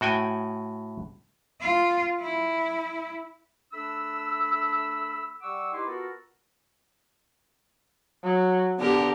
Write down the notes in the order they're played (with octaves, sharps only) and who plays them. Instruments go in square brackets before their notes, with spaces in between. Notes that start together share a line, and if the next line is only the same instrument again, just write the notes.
[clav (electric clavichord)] A2 F#4 G5 G#5
[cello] F4
E4
[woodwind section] A3 D4 B5 E6
G3 F#5 C#6 D6 E6
D#4 E4 G4 B4 C6
B3 F4 F#4 A4 A#4
[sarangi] F#3
[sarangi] D3 [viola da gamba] B3 G4 A#4